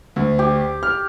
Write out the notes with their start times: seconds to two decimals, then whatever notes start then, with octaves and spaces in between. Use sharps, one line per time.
0.16 D2
0.39 G4
0.83 F6